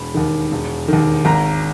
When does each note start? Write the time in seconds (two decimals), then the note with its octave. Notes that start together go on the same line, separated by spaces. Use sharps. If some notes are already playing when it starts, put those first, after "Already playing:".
Already playing: E1 B5
0.14 D#2 D#3
0.52 E1
0.88 D#2 D#3
1.25 G#1 A#5